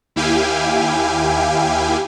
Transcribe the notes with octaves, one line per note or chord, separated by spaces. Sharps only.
D#2 E4 G4 F5 G5 G#5